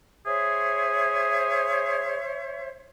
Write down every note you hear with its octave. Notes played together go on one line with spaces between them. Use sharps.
G#4 C5 C#5 E5